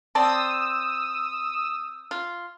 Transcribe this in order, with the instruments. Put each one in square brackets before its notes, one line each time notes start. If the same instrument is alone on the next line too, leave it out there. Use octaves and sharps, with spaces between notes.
[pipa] C4 D5 A5 [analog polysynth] D#6 E6
[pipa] F4